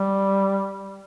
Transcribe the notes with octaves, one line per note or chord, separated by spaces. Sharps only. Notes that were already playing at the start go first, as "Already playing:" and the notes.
Already playing: G3